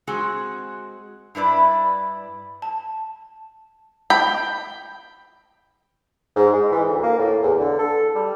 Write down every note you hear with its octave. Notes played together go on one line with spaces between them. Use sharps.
G#3 C4 F#4 G#4
G2 E4 B4 D5
A5
G5 B5
G#2
G#3
E3
D2
A#3
A2
E2
D3
A4
G3